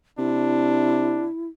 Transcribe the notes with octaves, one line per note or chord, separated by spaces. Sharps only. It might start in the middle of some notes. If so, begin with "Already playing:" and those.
C3 D4 E4